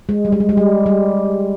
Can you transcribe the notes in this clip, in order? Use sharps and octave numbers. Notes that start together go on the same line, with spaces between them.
G#3
G3
G#3
G3
G#3
G3
G3